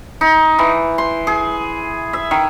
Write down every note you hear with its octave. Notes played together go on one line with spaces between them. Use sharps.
D#4
E3
C6
G#4
E5
D#3